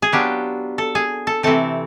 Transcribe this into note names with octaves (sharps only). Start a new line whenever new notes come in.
G#4
F#3 B3 D4 F4 G4
A4
G#4
A4
C3 E3 A3 C4 A4